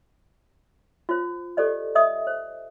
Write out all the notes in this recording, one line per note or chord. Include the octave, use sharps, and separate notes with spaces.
F4 C5
G4 A4 C5 D5 D#5
D#5 E5 D#6
C5